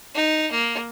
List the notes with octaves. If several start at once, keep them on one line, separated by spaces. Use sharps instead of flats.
D#4
A#3